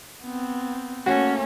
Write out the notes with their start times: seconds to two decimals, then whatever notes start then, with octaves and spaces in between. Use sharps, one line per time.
0.24 B3 C4
1.06 A3 A#3 C#4 F#4